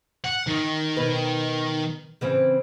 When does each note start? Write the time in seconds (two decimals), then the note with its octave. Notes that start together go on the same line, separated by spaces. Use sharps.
0.25 F#5
0.47 D#3
0.97 B2 B4
2.21 C#3 E3 C4